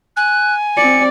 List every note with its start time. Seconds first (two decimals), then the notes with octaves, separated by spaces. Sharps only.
0.17 G#5 F#6
0.77 C4 D5 C#7